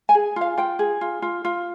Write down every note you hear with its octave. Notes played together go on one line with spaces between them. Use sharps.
G#5
G#4
F4 F5
F4 G5
G#4
F4
F4
F4